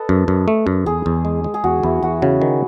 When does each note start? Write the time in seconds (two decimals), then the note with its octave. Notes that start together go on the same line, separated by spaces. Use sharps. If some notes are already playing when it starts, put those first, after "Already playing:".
Already playing: A4 B4 D#5
0.09 F#2
0.28 F#2
0.48 A3
0.67 F#2
0.86 E2 G#4
1.06 E2
1.25 G#3
1.44 G#3
1.54 G#4
1.64 E2 F#4
1.83 E2 E4
2.03 E2 F#4
2.22 C#3 F#4
2.42 D#3